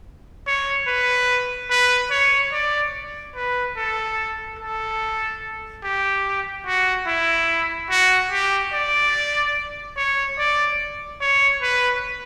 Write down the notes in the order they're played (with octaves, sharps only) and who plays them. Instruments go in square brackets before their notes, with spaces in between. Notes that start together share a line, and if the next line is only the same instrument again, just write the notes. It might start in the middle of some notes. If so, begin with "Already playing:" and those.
[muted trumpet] C#5
B4
B4
C#5
D5
B4
A4
A4
G4
F#4
E4
F#4
G4
D5
C#5
D5
C#5
B4